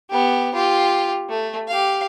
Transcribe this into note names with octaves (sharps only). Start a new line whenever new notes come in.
B3 G4
F4 G4
A3
G4 F5